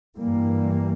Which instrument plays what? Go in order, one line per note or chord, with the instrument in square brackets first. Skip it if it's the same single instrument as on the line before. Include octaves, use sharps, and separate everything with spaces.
[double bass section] G2 E3 G3 A#3